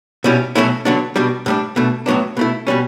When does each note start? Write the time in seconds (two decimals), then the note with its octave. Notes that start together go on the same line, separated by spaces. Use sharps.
0.24 B2 G3 C#4 E4
0.55 B2 F#3 A3 C#4 E4
0.85 D3 F#3 B3 D4
1.16 B2 G3 D4
1.46 A2 G3 D4
1.76 B2 A3 D4
2.06 A2 F#3 B3 D4
2.37 B2 A3 E4
2.67 B2 G3 C#4